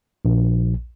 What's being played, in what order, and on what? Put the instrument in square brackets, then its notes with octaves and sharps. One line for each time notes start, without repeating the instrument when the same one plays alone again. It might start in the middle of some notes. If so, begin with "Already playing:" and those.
[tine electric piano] A#1